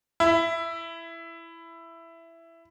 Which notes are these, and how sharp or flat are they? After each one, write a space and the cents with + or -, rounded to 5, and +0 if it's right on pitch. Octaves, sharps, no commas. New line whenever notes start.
E4 +10